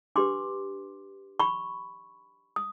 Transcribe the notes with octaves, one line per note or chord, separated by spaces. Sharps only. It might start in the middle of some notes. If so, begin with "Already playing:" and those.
D4 G4 B4 C6 D6
B5 C#6
D#6